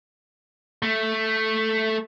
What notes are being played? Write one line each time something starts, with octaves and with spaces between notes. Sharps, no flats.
A3